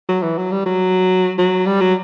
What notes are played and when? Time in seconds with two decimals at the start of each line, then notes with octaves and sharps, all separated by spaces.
0.09 F#3
0.23 E3
0.38 F#3
0.52 G3
0.66 F#3
1.38 F#3
1.67 G3
1.81 F#3